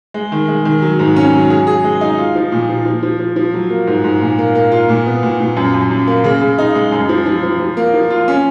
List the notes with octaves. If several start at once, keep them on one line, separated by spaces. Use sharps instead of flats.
G#3
D#3
G#3
D#3
F#3
G#2
C#4
F#3
G#4
G#4
G#3
D#4
F4
F3
A#2
F3
F3
F3
F3
F3
F#3
A#3
G#2
G#2
A#2
A#3
A#3
F4
A#2
B3
A#2
A#2
F#2
F#2
F#2
A#3
C#3
C#3
D#4
G#3
F#2
F3
F3
F3
F3
A#3
F3
F4
C#4